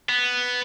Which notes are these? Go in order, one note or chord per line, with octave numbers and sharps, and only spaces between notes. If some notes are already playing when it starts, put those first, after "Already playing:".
B3